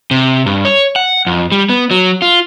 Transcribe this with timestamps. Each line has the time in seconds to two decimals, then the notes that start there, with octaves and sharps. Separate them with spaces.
0.11 C3
0.46 G2
0.65 C#5
0.96 F#5
1.26 F2
1.52 G3
1.69 B3
1.91 F#3
2.22 F4